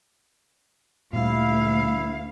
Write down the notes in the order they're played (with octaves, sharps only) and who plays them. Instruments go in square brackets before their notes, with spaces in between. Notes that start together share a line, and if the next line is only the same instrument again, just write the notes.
[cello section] D2 F5 [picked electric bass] A#2 G3 [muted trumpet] E4